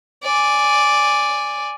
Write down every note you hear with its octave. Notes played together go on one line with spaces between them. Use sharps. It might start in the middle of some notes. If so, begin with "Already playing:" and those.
D5 G#5